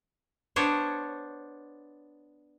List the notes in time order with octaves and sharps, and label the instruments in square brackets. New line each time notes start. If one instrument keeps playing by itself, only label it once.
[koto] B3 D4 C5 C#5